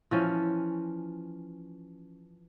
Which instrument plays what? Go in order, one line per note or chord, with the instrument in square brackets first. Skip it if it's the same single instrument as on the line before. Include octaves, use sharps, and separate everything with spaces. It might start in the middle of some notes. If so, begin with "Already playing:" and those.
[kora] E3 F3 C#4